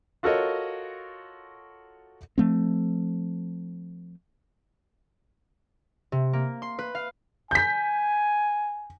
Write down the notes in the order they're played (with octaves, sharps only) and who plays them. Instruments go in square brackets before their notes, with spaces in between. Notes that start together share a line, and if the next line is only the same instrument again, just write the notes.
[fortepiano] F4 F#4 A4 A#4 C#5 D#5
[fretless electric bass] F3 A3 C4
[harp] C3
A#3
C6
B4
F5
[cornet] G#5 [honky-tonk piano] G6 B6